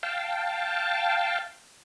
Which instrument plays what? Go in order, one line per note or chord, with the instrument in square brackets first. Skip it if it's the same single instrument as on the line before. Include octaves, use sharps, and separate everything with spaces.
[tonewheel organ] F5 G5 A5